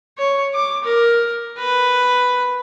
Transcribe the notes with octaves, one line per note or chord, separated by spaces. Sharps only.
C#5
D6
A#4
B4